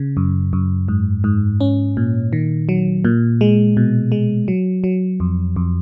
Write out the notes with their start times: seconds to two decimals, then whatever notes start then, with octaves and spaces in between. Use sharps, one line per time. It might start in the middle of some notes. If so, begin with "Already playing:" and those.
Already playing: C#3
0.17 F#2
0.53 F#2
0.88 G#2
1.24 G#2
1.60 C#4
1.97 A#2
2.33 D#3
2.69 F#3
3.04 A#2
3.41 G#3
3.77 B2
4.12 G#3
4.48 F#3
4.84 F#3
5.20 F2
5.56 F2